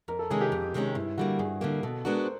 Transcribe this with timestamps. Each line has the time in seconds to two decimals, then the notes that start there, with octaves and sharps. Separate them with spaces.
0.08 F2 A#4
0.19 A4
0.30 C3 D#3 G#3 C#4 G#4
0.41 G4
0.52 F2
0.74 C3 D#3 G#3 C#4
0.95 G2 E4
1.18 D3 G3 A#3 F#4
1.39 G2 G#4
1.61 D3 G3 A#3
1.83 B2 A4
2.05 G#3 B3 D4 F#4 A#4
2.22 C5